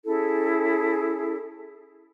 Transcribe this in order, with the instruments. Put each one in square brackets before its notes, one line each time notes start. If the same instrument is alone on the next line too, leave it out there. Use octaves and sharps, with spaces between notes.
[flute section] C#4 E4 G#4 A4